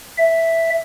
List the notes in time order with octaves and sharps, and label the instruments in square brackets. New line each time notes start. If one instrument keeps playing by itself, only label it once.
[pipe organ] E5